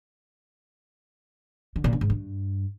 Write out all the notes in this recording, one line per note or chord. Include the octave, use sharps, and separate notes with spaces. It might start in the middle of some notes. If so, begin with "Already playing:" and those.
D3
A#2
D3
G#2
G2